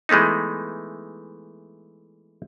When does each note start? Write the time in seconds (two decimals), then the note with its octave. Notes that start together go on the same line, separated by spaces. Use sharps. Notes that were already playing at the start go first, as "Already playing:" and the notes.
0.09 E3 G#3 A3 B3 D#4